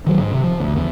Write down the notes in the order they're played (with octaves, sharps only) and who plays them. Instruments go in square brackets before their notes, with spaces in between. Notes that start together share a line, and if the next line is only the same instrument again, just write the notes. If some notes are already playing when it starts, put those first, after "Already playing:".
[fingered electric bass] D#3 F#3
G#2
C3
F3
D2
E2